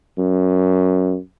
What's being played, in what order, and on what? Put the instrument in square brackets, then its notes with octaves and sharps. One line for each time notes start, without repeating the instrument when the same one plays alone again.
[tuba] F#2